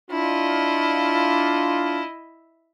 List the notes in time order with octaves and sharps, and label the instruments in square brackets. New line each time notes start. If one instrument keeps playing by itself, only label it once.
[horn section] D4 F4 [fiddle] E4 D#5